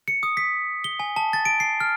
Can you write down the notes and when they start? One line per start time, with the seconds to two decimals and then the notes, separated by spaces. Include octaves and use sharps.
0.08 C#7
0.23 D#6
0.37 B6
0.84 G7
1.00 G#5
1.16 A5
1.33 A6
1.45 D7
1.60 C7
1.80 F6